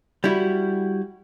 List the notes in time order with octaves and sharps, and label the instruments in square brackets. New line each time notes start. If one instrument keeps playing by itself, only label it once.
[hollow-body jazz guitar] G3 E4 F#4